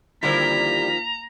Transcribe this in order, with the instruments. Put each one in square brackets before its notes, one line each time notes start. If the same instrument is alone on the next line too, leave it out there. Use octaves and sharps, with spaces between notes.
[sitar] D3 G3 E4 [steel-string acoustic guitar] D#3 F3 [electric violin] A#3 B6 [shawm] A#5